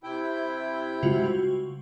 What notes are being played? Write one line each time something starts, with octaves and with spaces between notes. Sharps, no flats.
C3 E4 G5
C#3 G3 G#3 F4 F#4